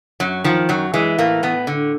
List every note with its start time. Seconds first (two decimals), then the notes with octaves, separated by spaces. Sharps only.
0.20 F#2 F#3
0.44 D#3 F3
0.69 F#2 F#3
0.94 E3 G#3
1.18 A2 A#3
1.43 A2 B3
1.67 D3